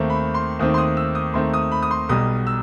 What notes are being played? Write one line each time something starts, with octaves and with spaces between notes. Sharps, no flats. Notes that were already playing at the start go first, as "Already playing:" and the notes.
Already playing: D#2 D#3 A3 C4
B5
C6
D#2 D#3 A3 C4 D#6
C6
D#6
E6
D#6
D#2 D#3 A3 C4 C6
D#6
B5
D#6
C6
B1 B2 G3 D#6
E6